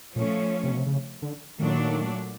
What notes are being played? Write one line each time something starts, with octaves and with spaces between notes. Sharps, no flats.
A#2 F3 A3 C#4
C3
B2
C3
C#3
D3
A#2 D#3 F#3 A3 D4